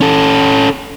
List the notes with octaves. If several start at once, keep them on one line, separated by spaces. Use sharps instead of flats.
C#4 A4